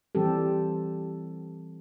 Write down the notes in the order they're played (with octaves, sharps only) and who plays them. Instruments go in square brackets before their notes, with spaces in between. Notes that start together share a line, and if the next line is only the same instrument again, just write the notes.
[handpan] E3 G3 C4 G4 A4